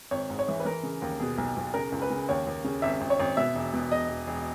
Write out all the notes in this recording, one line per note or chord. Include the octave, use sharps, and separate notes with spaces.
G#1 C#5
G#2
C#5
E3
B4
E3 A#4
C#3
D#2
B2 G#4
B1
B1
C#3 A#4
C#2
B4
C#3
D#2 C#5
D#2
C#3
G#1 E5
G#1
C#5
G#1
B2 E5
E1
B2
E1 D#5
E1
E1